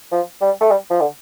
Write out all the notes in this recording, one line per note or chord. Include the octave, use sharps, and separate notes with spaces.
F3
G3
A3
G3
F3
D3